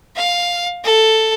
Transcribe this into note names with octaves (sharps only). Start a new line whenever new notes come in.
F5
A4